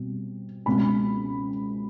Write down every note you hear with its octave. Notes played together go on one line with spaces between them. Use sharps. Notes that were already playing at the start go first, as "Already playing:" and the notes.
Already playing: B2 G3 C4
C#2 B2 G#3 C4 B5